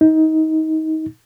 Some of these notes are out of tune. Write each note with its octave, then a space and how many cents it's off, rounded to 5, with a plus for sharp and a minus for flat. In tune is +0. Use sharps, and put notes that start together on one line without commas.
D#4 +25